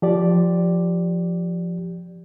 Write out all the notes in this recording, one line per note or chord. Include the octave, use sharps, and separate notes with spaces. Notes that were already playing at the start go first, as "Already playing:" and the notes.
F3 G4 D5